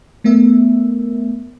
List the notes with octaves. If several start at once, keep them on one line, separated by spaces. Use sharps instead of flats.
A3 B3 A#4 E5